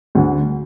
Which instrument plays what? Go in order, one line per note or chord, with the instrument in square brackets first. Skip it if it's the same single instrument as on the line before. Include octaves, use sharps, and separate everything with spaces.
[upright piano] D2 D3